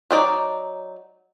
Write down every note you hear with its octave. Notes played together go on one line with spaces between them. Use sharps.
F#3 D#4 D5